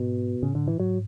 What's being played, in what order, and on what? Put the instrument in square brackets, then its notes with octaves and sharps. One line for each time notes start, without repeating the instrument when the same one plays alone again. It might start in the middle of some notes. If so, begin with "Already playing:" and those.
Already playing: [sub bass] G#2 [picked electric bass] B2
[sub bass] A2 [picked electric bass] C#3
[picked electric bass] D3
E3
[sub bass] G#2 [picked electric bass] F#3